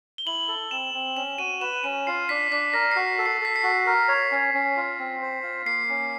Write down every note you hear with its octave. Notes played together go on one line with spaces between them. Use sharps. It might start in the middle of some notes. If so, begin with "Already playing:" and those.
G7
E4 F#7
A4
C4 E7
C4
C#4 E7
F#4 D#7
B4 E7
C#4 D#7
F4 C7
D4 B6
D4 B6
A#4 A#6
C7
F#4 B6
A4
C7
A4 B6
C7
F#4
A#4
C#5
C#4
C#4
F4
C4
C5
F4
A#3 C7
C#4